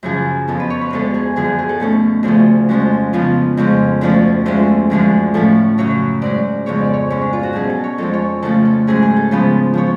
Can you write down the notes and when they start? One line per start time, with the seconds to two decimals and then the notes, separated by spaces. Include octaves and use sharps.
0.03 F#2 C#3 F3 G#4
0.48 F2 F3 B3 A4
0.60 B4
0.70 C#5
0.81 B4
0.90 D2 D3 G#3 B3 A4
1.14 G#4
1.36 F#2 D3 F3 G#4
1.59 G#4
1.69 A4
1.80 B2 A3 C#4 A4
2.23 D2 C#3 F3 A3 G#4
2.69 F2 F3 G#3 C#4 F#4
3.13 C#3 F3 B3 F4
3.57 F2 C#3 G#3 C#4
4.01 D2 D3 F3 A3 C#4 D4
4.46 D2 D3 G#3 C#4 F4
4.90 F#2 D3 F3 G#3
5.34 A2 F3 A3 C#4 A4
5.78 F#2 C#3 F#3 C#5
6.22 G#2 F#3 C#4 D5
6.66 F2 C#3 G#3 B3 C#5
6.81 D5
6.94 C#5
7.10 G#2 G#3 C#4 C#5
7.21 D4
7.33 F4
7.43 F#4
7.53 B2 F#3 C#4 G#4
7.70 A4
7.84 C#5
7.98 F2 F3 G#3 A4
8.14 C#5
8.42 C#3 F3 A3 A4
8.65 A4
8.87 G#2 F#3 C#4 G#4
9.02 G#4
9.16 A4
9.31 C#3 F3 G#3 B3 B4
9.74 F3 B3 C#5